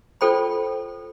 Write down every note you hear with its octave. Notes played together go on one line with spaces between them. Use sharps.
F4 A4 C5 G5 B5